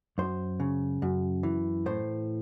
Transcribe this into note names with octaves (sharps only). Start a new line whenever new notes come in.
F#2 C5
C#3
F#2
E3
A2 C5